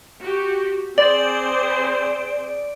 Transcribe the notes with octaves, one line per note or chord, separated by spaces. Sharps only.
F#4 G4
C4 G#4 C5 D5